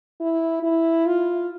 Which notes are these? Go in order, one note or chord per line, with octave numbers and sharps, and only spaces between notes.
E4
E4
F4